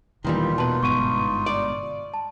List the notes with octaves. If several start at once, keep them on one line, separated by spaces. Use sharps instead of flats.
E1 A#2 D#3 E3 G3 D#4 F4
B2 B4 A5
G1 G#2 B3 C#6 D#7
D5
A5